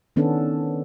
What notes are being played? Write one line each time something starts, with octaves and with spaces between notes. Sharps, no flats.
D#3 B3 C#4 D4 A4